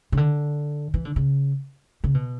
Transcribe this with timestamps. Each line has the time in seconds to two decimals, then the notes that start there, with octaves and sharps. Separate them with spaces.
0.12 C#3
0.17 D3
0.94 E3
1.05 D3
1.16 C#3
2.04 C#3
2.14 B2